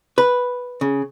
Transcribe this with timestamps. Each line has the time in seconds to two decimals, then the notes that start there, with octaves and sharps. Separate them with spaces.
0.18 B4
0.81 C#3